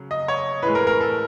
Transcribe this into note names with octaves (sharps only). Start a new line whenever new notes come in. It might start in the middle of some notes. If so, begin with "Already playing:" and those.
Already playing: C#3 F#3
D#5
C#5
A2 E3 G#3 B4
A#4
A#4
A4